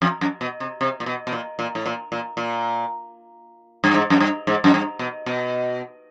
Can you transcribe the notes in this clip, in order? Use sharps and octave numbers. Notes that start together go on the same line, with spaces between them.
F2
F#2
B2
C3
C3
A#2
B2
B2
A#2
A#2
A2
A#2
A#2
A#2
G2
G#2
F#2
G2
G#2
F#2
G2
B2
B2